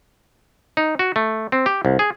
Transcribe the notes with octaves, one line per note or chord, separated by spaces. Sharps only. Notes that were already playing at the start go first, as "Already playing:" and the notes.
D#4
F#4
A3
C4
G4
C2
G#4